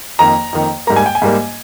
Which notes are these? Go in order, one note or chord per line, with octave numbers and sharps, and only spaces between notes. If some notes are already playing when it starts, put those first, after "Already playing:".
F2 D#3 A#3 A#5
F2 D#3 A#3
G#2 G3 A#3 A#5
G#5
G5
G#5
G#2 G3 A#3